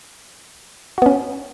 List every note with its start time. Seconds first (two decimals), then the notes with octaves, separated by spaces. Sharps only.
0.98 F#4
1.02 B3
1.06 C#4